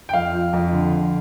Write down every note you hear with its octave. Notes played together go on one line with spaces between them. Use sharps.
G5
F2 F5
F3
F2
D3
F2